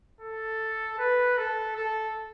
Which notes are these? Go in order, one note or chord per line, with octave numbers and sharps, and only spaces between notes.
A4
B4
A4
A4